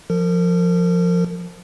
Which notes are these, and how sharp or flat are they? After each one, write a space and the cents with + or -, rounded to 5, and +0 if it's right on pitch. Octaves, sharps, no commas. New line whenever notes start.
F3 +0 A#4 -35